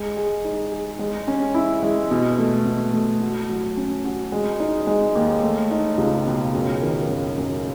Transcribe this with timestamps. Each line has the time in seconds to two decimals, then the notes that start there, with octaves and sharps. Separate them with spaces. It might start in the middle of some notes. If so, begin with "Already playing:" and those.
Already playing: G#3
0.17 G#4
0.44 D#4
0.72 G#4
0.99 G#3
1.28 C#4
1.54 E4
1.83 G#3
2.11 B2
2.38 A3
2.66 B2
2.93 A3
3.21 F#4
3.49 F#3
3.77 C#4
4.04 F#4
4.32 G#3
4.60 D#4
4.87 G#3
5.15 D#2
5.43 A3
5.71 D#4
5.98 C#2
6.27 B2
6.54 F#2
6.82 D#3
7.09 F#2
7.37 F#2